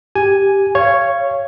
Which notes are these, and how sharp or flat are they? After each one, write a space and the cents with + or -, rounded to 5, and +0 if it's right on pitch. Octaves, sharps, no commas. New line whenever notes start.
G4 +0 G#5 +0
C#5 +0 F5 -25